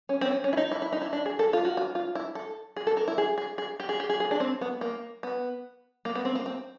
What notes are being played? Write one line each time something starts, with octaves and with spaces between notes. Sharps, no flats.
C#4
C4
C#4
C#4
E4
D#4
E4
E4
D#4
E4
D4
G#4
A4
F4
F#4
F4
F4
E4
A4
G#4
A4
A#4
E4
G#4
G#4
G#4
G4
G#4
G4
G#4
G#4
D4
C4
B3
A#3
B3
A#3
B3
C4
A#3
C4